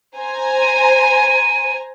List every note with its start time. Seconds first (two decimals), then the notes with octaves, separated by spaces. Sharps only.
0.17 C5 G#5 A#5
0.61 D#7